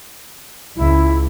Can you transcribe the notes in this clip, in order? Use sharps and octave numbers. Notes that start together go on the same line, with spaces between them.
C#2 E4